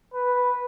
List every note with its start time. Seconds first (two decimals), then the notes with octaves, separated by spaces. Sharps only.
0.14 B4